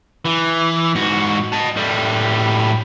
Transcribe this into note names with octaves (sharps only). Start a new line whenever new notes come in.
E3
G#2 F#4
D#5 A5
A2 G3